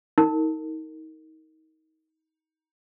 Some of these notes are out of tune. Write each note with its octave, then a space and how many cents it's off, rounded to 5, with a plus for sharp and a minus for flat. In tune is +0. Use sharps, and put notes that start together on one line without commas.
D#4 +30 A#4 -30